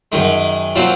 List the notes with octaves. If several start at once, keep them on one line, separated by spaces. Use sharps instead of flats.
F#2 D#3 G#3
A#2 F#3 C4 F4 C5